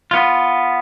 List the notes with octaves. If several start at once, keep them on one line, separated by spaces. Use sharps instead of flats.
B3 F4